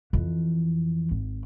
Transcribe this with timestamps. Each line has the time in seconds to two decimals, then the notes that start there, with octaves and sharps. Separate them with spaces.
0.13 F2 E3
1.11 G#1